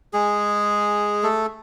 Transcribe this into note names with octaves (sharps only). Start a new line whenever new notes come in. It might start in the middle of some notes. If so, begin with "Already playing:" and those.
G#3 G#4
A3 A4